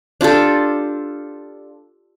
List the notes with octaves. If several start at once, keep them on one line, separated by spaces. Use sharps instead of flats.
D4 F4 G4 A4